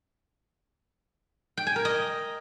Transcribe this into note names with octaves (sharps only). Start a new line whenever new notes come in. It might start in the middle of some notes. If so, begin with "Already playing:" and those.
G5
G#5
A#4
D#5